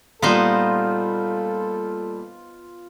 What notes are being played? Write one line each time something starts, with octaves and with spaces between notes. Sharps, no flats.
A#2 G3 B3 D#4 F4 A4 C5